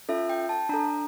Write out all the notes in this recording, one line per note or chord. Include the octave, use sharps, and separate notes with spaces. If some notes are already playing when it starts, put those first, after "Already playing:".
C#4 F4 A4 E5
G5
A5
D4 A4 A#5